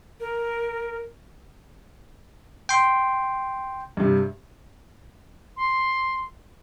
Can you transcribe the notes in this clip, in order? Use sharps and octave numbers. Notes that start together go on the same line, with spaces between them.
A#4
G5 C6
G2 C3
C6